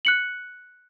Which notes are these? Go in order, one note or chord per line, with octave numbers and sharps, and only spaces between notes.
F#6 C#7 F#7